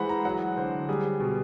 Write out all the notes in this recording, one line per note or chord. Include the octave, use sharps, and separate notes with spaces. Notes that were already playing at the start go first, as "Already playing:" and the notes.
Already playing: E3 G#3 C5 F#5 B5
A#5
F#3 F#5
D3 C5
G3 G#4
B2